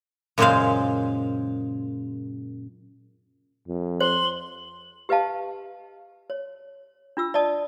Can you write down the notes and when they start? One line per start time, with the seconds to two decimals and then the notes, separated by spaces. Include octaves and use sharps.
0.38 F#2 A#2 C#3 G#3 C5 F5
3.68 F2
4.01 C5 C6 F#7
5.09 G4 B4 D#5 F5 A5
6.30 C#5
7.17 D4 F4 E6
7.34 D5 D#5 A5 D#6